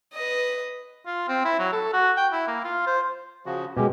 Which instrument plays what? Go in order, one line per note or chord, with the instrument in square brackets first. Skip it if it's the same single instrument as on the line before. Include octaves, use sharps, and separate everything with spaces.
[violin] B4 D#5
[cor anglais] F4
C4
E4
F#3
A4
F#4
G5
E4
A#3
F4
C5
[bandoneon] C#3 F3 F#4
[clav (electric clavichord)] B2 G#3 [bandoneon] C#4 G4